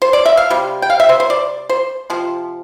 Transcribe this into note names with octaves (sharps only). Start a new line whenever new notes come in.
C5
D5
E5
F5
C3 G3
G5
F5
E5
C5
C5
D5
C5
C3 F3